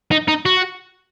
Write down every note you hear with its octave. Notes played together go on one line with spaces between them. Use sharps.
D#4
D#4
F#4